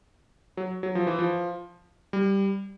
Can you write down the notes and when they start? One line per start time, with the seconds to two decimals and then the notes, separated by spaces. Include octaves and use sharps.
0.57 F#3
0.83 F#3
0.95 F3
1.07 E3
1.19 F3
2.13 G3